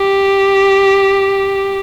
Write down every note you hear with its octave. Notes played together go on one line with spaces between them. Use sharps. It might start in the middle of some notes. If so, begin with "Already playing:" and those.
Already playing: G4